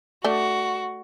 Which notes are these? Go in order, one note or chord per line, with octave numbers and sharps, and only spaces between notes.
A3 D4 F#4